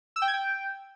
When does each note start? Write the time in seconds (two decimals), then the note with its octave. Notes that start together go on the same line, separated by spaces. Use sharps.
0.16 E6
0.22 G5
0.28 G#6
0.33 G5